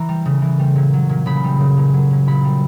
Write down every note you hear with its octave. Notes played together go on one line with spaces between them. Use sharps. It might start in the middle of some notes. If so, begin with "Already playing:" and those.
Already playing: E3 A#5
G3
C#3
E3
G3
A#2
F#3
A#2
C#3 B5
G3
C#3
A#2
F#3
A#2
A#2 B5
G3